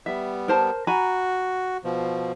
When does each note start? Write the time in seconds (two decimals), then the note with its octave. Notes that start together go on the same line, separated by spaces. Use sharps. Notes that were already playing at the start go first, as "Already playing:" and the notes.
0.06 G3 B3 E5
0.48 A#4 C5 A5
0.87 F#4 G#5 A#5 B5
1.84 B2 F3